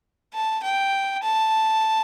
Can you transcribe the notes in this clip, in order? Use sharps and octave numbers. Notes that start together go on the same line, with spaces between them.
A5
G5
A5